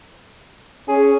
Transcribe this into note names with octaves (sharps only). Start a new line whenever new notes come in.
C#4 G#4